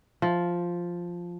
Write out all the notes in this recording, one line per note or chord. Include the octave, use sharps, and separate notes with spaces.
F3